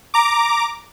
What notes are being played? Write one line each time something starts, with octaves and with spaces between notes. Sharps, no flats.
A#5 D6